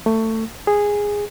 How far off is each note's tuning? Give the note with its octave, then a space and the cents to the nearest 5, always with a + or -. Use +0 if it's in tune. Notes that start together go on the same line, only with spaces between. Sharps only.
A3 +20
G#4 -10